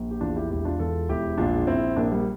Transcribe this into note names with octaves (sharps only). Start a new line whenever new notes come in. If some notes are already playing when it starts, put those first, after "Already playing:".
Already playing: A#1 A#2
G4
E2 D4 F4
E4 G4
E1 E4 G4
D4 F4
E2 F4 A4
E1 E4 G4
A#1 D4 F4
A#1 C4 E4
A#1 A#3 D4
G3 A#3